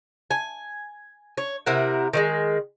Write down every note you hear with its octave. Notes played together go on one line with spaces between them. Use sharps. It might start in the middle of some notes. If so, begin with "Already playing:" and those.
G#5
C#5
C3 E4 A#4 F#5
D#3 G3 G#3